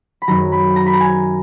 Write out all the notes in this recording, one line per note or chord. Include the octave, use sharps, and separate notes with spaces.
B5
F#2 D#3 F#3 A#5
B5
A#5
B5
A#5
G#5